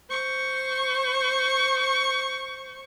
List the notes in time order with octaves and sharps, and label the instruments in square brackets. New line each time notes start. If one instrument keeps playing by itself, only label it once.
[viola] C5 C#6